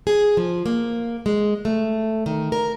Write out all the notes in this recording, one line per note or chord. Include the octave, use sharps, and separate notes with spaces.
G#4
F3
A#3
G#3
A3
D#3
A#4